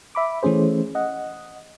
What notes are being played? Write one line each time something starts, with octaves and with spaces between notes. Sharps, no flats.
E5 B5 D6
E3 A3 C#4 G#4 C5
D#5 F#5